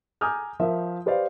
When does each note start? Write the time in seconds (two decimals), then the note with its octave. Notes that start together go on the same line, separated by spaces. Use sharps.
0.21 G#5 A#5 D6 D#6 F6 G6
0.59 F3 A#4 E5
1.06 G4 B4 C5 D5 F5